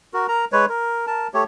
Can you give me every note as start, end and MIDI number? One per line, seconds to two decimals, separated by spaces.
0.14 0.27 66
0.14 0.27 70
0.28 0.45 70
0.28 0.45 82
0.52 0.66 56
0.52 0.66 71
0.52 0.66 73
0.69 1.06 70
1.07 1.28 70
1.07 1.28 81
1.34 1.44 57
1.34 1.44 67
1.34 1.44 73